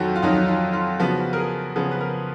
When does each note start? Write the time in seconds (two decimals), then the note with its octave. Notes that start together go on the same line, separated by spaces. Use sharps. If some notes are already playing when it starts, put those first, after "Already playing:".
Already playing: F2 D#3 F#3 F#4
0.16 F4
0.22 F2 D#3 F#3 D#4
0.48 F4
0.73 F4
0.99 C#3 F3 B3 F#4
1.33 A#4
1.37 G#4
1.76 C#3 F3 B3 G#4
1.91 B4
2.01 A#4